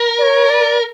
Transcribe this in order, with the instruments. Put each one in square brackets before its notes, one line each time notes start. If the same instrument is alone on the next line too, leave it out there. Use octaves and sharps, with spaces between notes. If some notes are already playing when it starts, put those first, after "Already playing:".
Already playing: [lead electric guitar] A#4
[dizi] D5
C#5
D5